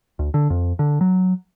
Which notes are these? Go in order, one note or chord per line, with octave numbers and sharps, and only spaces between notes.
D2
D3
F2
D3
F#3